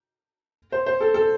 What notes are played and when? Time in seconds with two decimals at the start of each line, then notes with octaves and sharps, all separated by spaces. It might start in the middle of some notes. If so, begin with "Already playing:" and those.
0.72 C5
0.86 C5
1.01 A4
1.14 A4